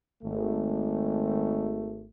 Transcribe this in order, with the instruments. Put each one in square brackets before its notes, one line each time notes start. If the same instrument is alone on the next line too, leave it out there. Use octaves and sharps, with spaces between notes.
[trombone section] G#1 A3